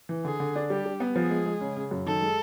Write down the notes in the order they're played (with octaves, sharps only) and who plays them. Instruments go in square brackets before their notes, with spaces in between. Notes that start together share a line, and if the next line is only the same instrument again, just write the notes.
[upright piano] E3
[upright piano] D3 [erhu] G#4
[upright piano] D3
D4
[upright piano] G3 [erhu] G4
[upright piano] G3
B3
[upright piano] F3 [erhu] G#4
[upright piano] G#3
G#3
C#3
C#3
F#2
[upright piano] D#3 [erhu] A4
[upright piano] G#3